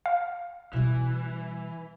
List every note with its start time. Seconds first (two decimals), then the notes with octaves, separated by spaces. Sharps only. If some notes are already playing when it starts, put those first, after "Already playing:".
0.06 F5
0.73 B2 E3 G3